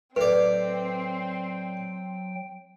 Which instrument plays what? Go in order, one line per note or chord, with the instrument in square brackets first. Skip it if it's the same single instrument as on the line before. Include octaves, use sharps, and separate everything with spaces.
[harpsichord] A2 D5 [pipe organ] F#3 G5 [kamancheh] C4 [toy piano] B4